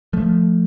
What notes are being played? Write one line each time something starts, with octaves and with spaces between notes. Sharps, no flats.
F3 A3